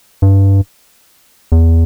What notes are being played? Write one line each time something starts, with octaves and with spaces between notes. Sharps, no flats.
G2
E2